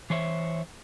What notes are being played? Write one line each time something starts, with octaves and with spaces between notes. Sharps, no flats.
E3 C5 C#5 E5